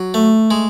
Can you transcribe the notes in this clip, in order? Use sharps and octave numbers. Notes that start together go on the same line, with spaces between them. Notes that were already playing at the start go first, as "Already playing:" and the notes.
Already playing: F#3
A3
G#3